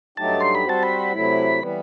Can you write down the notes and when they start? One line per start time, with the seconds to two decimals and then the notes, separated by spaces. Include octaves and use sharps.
0.17 G2 F#3 A3 D#4 G4 A5
0.40 C6
0.55 B5
0.65 G3 C4 F#4 C5 A5
0.83 B5
1.12 C3 F#3 A3 E4
1.60 E3 G3 B3